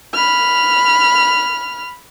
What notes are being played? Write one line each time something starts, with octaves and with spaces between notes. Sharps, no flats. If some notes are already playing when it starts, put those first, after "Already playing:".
B5 F6